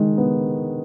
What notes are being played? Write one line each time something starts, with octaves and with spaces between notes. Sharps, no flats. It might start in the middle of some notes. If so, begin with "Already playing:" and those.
Already playing: D#3 G#3
B3